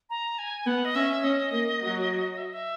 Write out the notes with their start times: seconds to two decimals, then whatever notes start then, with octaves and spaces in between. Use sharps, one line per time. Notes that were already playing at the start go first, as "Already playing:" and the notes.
0.10 A#5
0.38 G#5
0.67 B3 F#5
0.85 D#5
0.95 C#4 E5
1.24 C#4 D#5
1.52 A#3
1.81 F#3
2.37 E5
2.45 D#5
2.53 E5